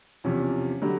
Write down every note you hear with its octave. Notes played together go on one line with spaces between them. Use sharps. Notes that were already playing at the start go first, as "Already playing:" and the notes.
E2 C3 F3 C#4
D3 F#3 G3